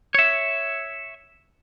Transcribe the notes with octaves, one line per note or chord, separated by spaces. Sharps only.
C#5 E5